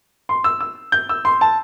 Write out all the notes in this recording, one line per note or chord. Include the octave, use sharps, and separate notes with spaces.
C6
E6
E6
G6
E6
C6
A5